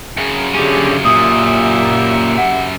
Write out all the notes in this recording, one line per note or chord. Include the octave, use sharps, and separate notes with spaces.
F#2 C#3 G#4
D3 C#4 G4 G#4
A#2 G4 E5 D#6
F#5